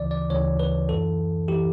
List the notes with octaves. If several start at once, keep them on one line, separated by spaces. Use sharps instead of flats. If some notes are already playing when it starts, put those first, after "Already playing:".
Already playing: D2 C#3 E3 D5
D5
D2 C#3 E3 C#5
B4
F#2 E3 A4
E3 G4